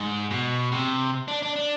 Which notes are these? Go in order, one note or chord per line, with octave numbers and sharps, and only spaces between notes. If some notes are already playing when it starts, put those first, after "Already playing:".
Already playing: G#2
B2
C3
D4
D4
D4